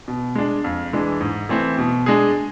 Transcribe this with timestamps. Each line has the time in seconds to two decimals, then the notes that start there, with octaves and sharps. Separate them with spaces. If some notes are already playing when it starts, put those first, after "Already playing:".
0.08 B2
0.35 G#3 D4
0.64 F2
0.93 E3 G#3 D4
1.21 G#2
1.49 E3 A3 C4
1.78 B2
2.06 G#3 D4 G#4